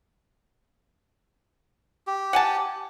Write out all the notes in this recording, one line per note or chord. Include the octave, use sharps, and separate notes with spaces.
G4
F#5 G#5 A5